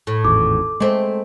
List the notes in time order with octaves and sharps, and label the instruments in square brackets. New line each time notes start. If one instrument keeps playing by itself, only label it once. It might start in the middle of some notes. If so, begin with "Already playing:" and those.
[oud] A2
[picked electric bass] G#1 E2 [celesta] D6
[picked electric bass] G#3 [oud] A3 C4